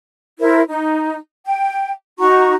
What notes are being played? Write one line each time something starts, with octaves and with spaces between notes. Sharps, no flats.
E4 A#4 C5
D#4
G5
D#4 F#4 A#5 C#6